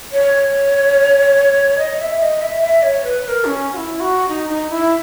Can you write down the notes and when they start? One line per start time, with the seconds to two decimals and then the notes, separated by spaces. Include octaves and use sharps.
0.12 C#5
1.78 D#5
2.00 E5
2.21 D#5
2.41 E5
2.62 E5
2.83 C#5
3.04 B4
3.24 B4
3.28 A#4
3.45 C#4
3.72 F#4
3.77 E4
4.00 F#4
4.29 D#4
4.50 D#4
4.70 E4